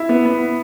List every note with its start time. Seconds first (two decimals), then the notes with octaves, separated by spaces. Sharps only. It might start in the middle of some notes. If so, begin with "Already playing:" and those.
Already playing: E4 E5
0.09 B3
0.25 B3